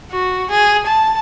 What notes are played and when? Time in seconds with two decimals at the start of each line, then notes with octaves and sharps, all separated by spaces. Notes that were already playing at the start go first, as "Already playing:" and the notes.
0.11 F#4
0.50 G#4
0.86 A5